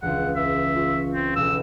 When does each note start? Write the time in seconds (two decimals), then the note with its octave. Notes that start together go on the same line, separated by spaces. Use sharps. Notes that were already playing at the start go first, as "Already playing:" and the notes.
0.02 E1 C#2 F#5
0.36 E5
0.75 F4 C#6
1.14 C4
1.36 E1 B1 B2 E6